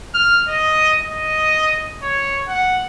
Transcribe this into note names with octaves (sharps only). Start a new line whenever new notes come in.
F6
D#5
D#5
C#5
F#5